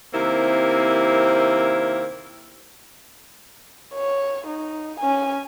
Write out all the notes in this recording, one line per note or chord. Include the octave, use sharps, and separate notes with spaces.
C3 D#3 A#3 C4 E4 G4
C#5
D#4
C#4 G#5